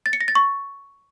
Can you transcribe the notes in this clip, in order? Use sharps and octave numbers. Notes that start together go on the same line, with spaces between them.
A6
C#7
A#6
A6
C#6